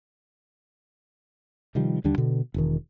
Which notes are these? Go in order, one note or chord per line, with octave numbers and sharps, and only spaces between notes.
C3 D#3 F3 G3
D#2 D3 G3 D4
B2 D3
E1 D#3